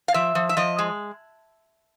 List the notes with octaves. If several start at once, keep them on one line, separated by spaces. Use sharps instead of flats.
F5
F3 E5
F3
E5
F3 D#5
G#3